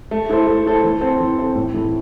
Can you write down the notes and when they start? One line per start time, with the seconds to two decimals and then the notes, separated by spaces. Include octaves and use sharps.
0.11 A3
0.29 E4 A4 C5
0.47 A3
0.66 E4 A4 C5
0.84 E3
1.01 C4 A4 C5
1.20 E3
1.39 C4 A4 C5
1.55 A2
1.74 E3 A3 E4